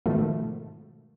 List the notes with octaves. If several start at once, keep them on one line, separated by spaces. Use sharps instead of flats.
G#2 B2 D#3 F3 A3